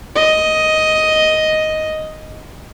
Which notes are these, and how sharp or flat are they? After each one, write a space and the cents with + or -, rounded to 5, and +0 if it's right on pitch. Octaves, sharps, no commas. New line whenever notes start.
D#5 +5